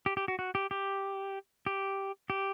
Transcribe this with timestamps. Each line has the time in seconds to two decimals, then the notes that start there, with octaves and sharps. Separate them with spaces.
0.06 G4
0.17 G4
0.28 F#4
0.39 F#4
0.55 G4
0.71 G4
1.66 G4
2.30 G4